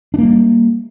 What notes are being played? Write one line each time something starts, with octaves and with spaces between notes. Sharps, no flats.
G3 A#3 D4